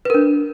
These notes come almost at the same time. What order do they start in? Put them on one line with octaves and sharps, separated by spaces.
B4 A#4 D4